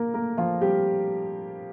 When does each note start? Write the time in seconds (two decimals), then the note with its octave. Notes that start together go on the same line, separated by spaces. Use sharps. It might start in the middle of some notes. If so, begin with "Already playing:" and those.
Already playing: A#3 A#4
0.14 A3 A#3 A#4
0.38 F3 F4
0.61 G3 C4 G4